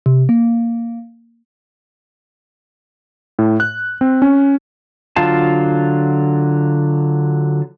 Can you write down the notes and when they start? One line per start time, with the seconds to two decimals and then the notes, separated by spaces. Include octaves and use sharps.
0.06 C3
0.29 A#3
3.39 A2
3.60 F#6
4.01 C4
4.22 C#4
5.16 D3 F#3 F4 F5 A5